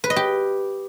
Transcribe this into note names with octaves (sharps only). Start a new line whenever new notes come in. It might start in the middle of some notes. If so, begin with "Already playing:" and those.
B4
D#5
G4